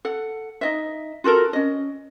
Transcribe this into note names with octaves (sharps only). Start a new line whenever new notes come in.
A4 F#5
D#4 D#5 E5
F4 F#4 A4 A#4
C#4 D#5